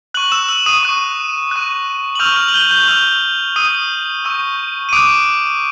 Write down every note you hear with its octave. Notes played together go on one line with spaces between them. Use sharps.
C#6 F#6 F#7
E6 E7
E6 E7
D#6 D#7
C#6 F#6
C#6 F#6
F#7
C#6 E6 F6 G6 F7
F6 F7
F#7
G6 G7
G6 G7
C#6 E6 F6 G6 F7
C#6 D#6 E6 G6 D#7
C#6 E6 G6
D#7
D6 D#6 F#6 D7